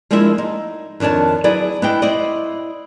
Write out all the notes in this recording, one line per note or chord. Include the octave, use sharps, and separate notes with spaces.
F3 G#3 A#3 D4 E4 E5
D#4
F2 D#3 D4 C#5 A5
F#3 B3 E4 G#4 D5
B3 D4 E4 D#5 G5
E4 C5 D5 D#5